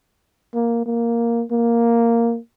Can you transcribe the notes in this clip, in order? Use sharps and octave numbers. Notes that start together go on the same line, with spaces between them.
A#3
A#3
A#3